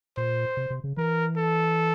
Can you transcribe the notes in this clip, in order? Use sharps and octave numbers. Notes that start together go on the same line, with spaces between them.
A#2 C5
C3
C3
C#3
E3 A#4
A4